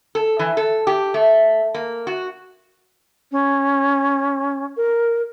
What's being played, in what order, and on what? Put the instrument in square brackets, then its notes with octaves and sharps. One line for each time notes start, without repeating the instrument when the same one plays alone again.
[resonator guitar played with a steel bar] A4
E3
A4
G4
A3
A#3
F#4
[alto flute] C#4
A#4